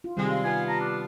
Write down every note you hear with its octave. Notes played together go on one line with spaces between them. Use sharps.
F4
C3 D#3 G3 G#3 C4
F5
B3 F4 G#5
A5 A#5
D4